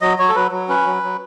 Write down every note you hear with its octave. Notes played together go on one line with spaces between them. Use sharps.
F#3 D#5
F#3 C#5
A4
F#3 B4
F#3
C#4 B4
F#3
F#3